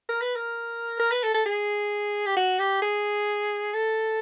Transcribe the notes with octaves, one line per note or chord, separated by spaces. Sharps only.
A#4
B4
A#4
A#4
B4
A4
A4
G#4
G4
F#4
G4
G#4
A4